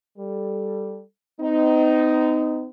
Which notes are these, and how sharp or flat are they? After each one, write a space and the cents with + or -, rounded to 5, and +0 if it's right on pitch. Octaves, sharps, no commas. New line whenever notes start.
G3 +0 A4 +0
C4 -45 D#4 +0